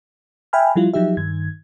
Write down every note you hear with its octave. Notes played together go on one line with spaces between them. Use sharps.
E5 G5 G#5 B5 F6
F3 G3 E4 F4
F3 F#3 D#4 G4 E5
G2 D#3 G#6